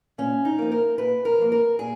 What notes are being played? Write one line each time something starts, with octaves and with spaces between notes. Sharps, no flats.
A#2 C#4
D#4
F3 A#3
A#4
A#2 B4
A#4
F3 A#3
A#4
A#2 G#4